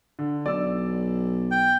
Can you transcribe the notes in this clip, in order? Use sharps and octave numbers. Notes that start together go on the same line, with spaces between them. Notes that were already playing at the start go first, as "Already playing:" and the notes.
D3
B1 D5 E6
G5